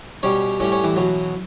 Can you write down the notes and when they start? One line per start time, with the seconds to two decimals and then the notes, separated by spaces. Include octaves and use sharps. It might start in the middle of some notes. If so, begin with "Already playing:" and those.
0.23 B2 G3 C#4 C#5
0.60 A2 G3 C#4 C#5
0.72 C#4 C#5
0.84 E3 E4
0.96 B2 F#3